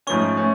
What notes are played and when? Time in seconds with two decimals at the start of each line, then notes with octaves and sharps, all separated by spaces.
0.07 G#2 F3 A3 C#4 C#6
0.37 A3 C#4